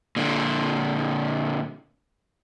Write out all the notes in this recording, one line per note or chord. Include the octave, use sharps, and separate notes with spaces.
A#2 D3